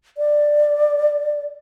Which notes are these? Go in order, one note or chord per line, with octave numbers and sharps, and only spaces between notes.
D5